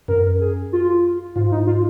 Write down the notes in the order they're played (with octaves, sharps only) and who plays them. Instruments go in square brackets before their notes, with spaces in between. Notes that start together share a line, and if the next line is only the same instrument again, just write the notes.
[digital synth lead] F#2 [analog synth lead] A#4
[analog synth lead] G#4
F4
[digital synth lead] G#2 [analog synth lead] F4
[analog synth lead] D#4
F4